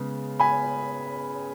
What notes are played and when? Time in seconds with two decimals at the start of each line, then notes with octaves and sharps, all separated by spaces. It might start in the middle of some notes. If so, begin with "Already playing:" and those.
Already playing: C#3 G#3 B3
0.40 G#5 B5